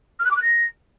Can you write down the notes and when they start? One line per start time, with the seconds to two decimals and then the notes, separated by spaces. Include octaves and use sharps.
0.19 F6
0.25 F#6
0.31 D6
0.36 F#6
0.42 A#6